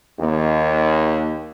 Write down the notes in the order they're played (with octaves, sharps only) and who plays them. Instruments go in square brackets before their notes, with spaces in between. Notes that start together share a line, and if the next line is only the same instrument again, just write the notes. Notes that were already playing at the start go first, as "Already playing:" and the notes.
[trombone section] D#2